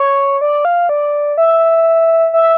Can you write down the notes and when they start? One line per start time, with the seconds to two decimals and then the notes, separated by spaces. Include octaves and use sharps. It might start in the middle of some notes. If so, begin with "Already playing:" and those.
Already playing: C#5
0.41 D5
0.65 F5
0.89 D5
1.38 E5
2.33 E5